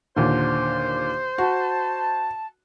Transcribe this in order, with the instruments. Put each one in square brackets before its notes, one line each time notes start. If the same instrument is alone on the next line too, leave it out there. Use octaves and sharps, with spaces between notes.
[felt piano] D#2 A#2 D3 [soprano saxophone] C5
[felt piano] F#4 [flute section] A5